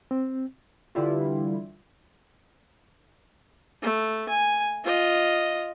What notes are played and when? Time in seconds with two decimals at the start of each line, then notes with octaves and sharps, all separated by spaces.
0.11 C4
0.95 D3 E3 G3 E4 F4
3.82 A3
4.29 G#5
4.85 F4 D#5